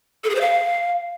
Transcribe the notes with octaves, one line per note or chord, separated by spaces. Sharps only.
A4
G#4
C5
F5